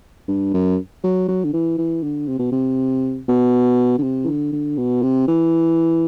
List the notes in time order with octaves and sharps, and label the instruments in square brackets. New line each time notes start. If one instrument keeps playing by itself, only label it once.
[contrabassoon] G2
F#2
F#3
F#3
D3
E3
E3
D3
C3
B2
C3
B2
D3
C3
E3
D3
D3
B2
C3
E3